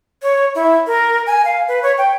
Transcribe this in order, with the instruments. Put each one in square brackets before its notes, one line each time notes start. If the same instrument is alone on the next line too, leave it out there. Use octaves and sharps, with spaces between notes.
[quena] C#5
E4
A#4
G#5
F5
B4
C#5
G5